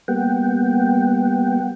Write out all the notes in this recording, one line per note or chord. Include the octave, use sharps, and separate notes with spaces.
G3 A#3 B3 F#5 G5